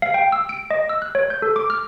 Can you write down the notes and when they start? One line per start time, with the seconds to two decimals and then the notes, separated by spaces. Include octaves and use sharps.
0.02 F5
0.14 G5
0.32 E6
0.49 D7
0.71 D#5
0.89 E6
1.02 F#6
1.15 C#5
1.30 G6
1.42 A4
1.56 D6
1.70 F6